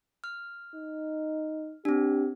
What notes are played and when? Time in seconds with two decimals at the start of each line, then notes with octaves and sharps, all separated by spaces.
0.24 F6
0.76 D#4
1.85 C4 D4 G4